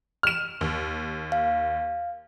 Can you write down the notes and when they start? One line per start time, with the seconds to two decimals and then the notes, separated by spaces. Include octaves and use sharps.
0.23 F6 E7
0.61 D#2
1.32 F5